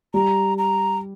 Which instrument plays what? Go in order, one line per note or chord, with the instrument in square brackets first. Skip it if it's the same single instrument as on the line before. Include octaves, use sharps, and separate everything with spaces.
[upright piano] G3 [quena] A#5
[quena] A#5